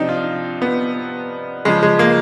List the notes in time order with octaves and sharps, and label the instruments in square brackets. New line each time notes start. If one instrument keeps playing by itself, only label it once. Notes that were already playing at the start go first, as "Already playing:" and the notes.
Already playing: [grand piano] C3 F3 C4 D4 D#4
F4
B3
C#3 F3 G#3
G#3
A#3